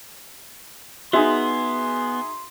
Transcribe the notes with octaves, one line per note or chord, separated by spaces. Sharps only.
B3 D#4 F#4 G#4 E5 C6